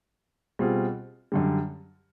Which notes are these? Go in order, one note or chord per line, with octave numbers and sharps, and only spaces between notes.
B2 G3 C4 F4 G#4
F#2 D3 G3